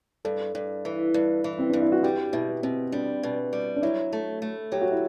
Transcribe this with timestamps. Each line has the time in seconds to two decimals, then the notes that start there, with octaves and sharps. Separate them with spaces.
0.25 G2 A4
0.55 G2
0.85 E3
1.14 G2
1.44 E3
1.58 C4
1.70 G2 D4
1.82 E4
1.92 F#4
2.03 G3 G4
2.33 B2 E4
2.63 B2 C4
2.92 G3 D4
3.23 B2
3.53 G3
3.76 D4
3.83 F#3 E4
4.13 A3
4.42 A3
4.72 F#3 G4
4.82 F#4
4.92 E4